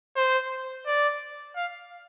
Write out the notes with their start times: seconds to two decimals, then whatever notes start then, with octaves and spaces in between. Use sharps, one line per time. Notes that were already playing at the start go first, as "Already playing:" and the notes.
0.17 C5
0.87 D5
1.56 F5